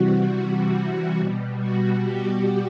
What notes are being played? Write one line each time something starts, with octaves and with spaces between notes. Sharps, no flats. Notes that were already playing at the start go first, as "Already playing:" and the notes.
Already playing: C3 E3 G3 F#4
B2 G3
F#4
G4